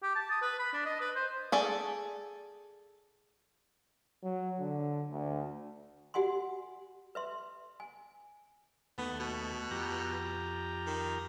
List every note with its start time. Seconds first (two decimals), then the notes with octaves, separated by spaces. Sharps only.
0.03 G4
0.15 A5
0.30 D#6
0.42 B4
0.59 B5
0.73 D4
0.85 D#5
1.00 B4
1.15 C5
1.52 G#4 A4 D5
4.24 F#3
4.59 D3
5.11 D2
6.14 F#4 G4 F#5 G#5 C6
7.15 B4 E5 C6
7.80 G#5
8.98 D#2 A3 B3
9.20 B2
9.71 F2 G4 A#5
10.87 D#3